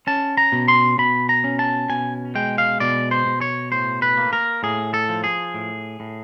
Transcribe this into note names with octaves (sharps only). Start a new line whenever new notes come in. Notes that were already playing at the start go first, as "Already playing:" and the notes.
C#4 A5
A#5
B2
C6
B2 B5
A#5
C#4
A5
B2 G#5
G#3 G5
F5
B2 D5
C5
B2
C#5
A2 C5
B4
A#3
A#4
A2 G#4
A4
F3
G#4
A2
A2